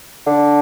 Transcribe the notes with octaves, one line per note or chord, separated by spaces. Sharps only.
D3